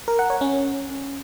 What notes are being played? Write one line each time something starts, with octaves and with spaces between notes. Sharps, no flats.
A#4
F#5
C#5
C#4